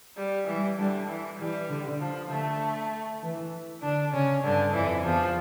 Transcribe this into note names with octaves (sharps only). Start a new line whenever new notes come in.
G3
E3 G3
D3 G3
E3
E3 G3
D3
F3
D3 A3
E3
D3 D4
C#3 C#4
G2 D3
F2 E3
E2 F3